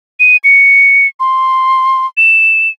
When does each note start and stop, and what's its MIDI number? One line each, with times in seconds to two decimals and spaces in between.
0.20 0.37 99
0.44 1.07 97
1.20 2.06 84
2.17 2.69 100